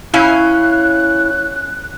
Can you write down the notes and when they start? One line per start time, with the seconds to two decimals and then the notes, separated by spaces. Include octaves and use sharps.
0.14 C#4 E4 F5 F#6